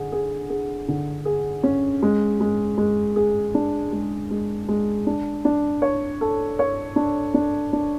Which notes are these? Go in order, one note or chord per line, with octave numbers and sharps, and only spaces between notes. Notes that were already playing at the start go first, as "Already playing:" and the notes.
Already playing: D3 G#4
G#4
G#4
D3
G#4
C#4
G#3
G#3
G#3
G#4
D4
G#3
G#3
G#3
D4
D4
C#5
A4
C#5
D4
D4
D4